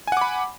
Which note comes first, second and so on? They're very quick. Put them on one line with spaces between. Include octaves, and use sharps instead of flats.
G#5 F#5 D6 B5